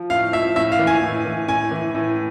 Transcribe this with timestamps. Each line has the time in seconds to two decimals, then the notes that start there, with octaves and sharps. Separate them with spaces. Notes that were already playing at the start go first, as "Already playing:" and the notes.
Already playing: F3
0.10 A2 F5
0.33 F3 E5
0.56 A2 E5
0.72 F5
0.79 E3
0.87 G#5
1.02 A2
1.25 E3
1.48 A2 G#5
1.71 E3
1.95 A2